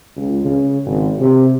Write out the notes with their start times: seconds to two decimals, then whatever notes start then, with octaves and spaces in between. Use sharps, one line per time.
0.16 C#2
0.45 C#3
0.86 G#1
1.19 C3